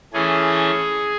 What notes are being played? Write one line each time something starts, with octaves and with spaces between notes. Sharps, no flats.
E3 A3 C#4 G#4